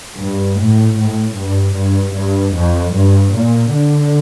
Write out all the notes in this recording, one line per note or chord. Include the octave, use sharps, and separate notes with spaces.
G2
A2
A2
G2
G2
G2
F2
G2
A#2
D3